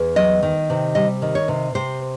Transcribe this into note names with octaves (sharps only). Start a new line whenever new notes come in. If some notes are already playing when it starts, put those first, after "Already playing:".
Already playing: E2
F#3 D#5
D#3
C3
G3 D#5
D#3
C#5
C3
C3 C5